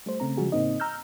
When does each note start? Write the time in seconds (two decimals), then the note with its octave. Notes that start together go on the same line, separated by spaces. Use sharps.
0.06 G3 A3 C5
0.20 C#3 A3 C4 A#5
0.37 C#3 F3 G3 G#3 F#4 G#4
0.52 A2 C#3 A#3 C4 D#4 D#5
0.80 A#5 E6 F6 G6